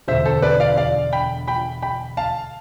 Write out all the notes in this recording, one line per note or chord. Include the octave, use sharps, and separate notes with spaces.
E1 D2 D3 C5 E5
A4 C5
B4 D5
D5 F5
D5 F5
G5 B5
G5 B5
G5 B5
F5 A5